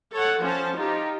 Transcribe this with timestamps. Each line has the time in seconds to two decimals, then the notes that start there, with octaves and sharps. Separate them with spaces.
0.13 A4 C#5 F#5
0.41 F3 C#4 C5 A5
0.76 D#4 F4 G4